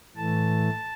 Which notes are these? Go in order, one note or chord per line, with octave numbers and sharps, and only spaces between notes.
A2 E3 A3 A5